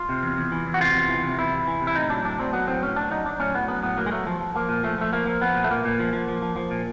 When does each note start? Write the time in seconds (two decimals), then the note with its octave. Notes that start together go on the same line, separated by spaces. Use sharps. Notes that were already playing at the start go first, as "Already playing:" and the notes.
Already playing: F4
0.09 C3
0.23 E2
0.37 E2
0.52 E3
0.66 E2
0.74 F#4
0.80 C3 F4
0.95 E2
1.09 E3
1.24 C3
1.38 E2 E4
1.52 E2
1.67 E3
1.82 C3
1.87 E4
1.95 A2 D#4
2.10 F#3 D4
2.25 A2 D4
2.38 F#3 C4
2.53 F#3 B3
2.67 A2 C4
2.82 A2 C#4
2.96 F#3 D4
3.11 F#3 D#4
3.25 F#3 D4
3.40 A2 C#4
3.55 A2 B3
3.68 F#3 B3
3.83 A2 B3
3.97 F#3 A#3
4.06 G#3
4.12 F#3 A3
4.27 F3
4.41 F3
4.55 F3 A#3
4.69 A#2
4.83 F3 A3
4.98 F3 A3
5.13 F3 A#3
5.27 F3
5.41 F3 B3
5.55 A#2
5.64 A3
5.70 A#2 A#3
5.85 A#2
6.00 F3
6.13 F3
6.28 F3
6.42 F3
6.56 F3
6.71 A#2